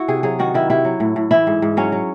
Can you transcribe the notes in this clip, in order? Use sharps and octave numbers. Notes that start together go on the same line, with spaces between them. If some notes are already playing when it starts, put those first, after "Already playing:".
Already playing: E4 F#4
C3 G#4
F#3 G#4
D#3 F#4
D#3 E4
C3 E4
F#3
A2
A2
E3 E4
G#2
G#2
F#3 C#4
F#3